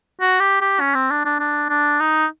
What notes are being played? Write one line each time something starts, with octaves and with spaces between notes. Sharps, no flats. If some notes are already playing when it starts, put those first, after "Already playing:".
F#4
G4
G4
C#4
C4
D4
D4
D4
D4
D#4